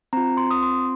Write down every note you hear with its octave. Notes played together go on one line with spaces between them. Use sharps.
C4 F4 A#5
C6
D#6
C6